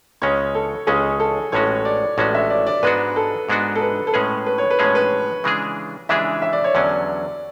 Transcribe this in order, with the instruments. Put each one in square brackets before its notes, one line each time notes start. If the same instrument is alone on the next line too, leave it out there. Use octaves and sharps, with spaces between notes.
[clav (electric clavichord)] C#2 C#3 G#3 C#4 [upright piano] C#5
[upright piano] A4
[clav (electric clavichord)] C#2 C#3 G#3 C#4 [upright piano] G#4
[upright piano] A4
[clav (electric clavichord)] A1 A2 G#3 C#4 F#4 [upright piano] C#5
[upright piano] D5
[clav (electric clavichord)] A1 A2 G#3 C#4 F#4 [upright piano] D5
[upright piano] E5
D5
D5
[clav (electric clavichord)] G#2 G#3 B3 D4 F#4 [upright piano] B4
[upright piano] A4
[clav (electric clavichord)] G#2 G#3 B3 D4 F#4
[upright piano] A4
B4
A4
[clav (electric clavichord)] A2 G#3 C#4 G#4 [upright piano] B4
[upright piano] B4
C#5
B4
[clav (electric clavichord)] A2 G#3 C#4 G#4 [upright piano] C#5
[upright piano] B4
[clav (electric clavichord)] C#3 E3 G#3 D4 G#4
[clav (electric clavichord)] C#3 E3 G#3 D4 G#4 [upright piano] E5
[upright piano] E5
D5
C#5
[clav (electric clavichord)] E2 D3 F#3 C#4 [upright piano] D5